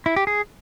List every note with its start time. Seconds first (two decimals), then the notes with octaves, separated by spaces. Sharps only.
0.06 E4
0.16 G4
0.27 G#4